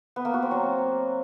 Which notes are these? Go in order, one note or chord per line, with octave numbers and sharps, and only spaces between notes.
B3
A#3
F#4
C4
F#3